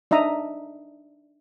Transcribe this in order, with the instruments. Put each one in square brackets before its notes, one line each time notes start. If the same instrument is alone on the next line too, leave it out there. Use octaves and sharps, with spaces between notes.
[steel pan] D4 D#4 E5 A#5 D#6